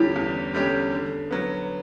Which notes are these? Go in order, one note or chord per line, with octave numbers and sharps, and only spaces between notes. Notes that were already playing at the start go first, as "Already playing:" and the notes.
Already playing: E2 D3 G3 C#4 E4 G4
E2
D3 G3 C#4 G4
D3
F#3 B3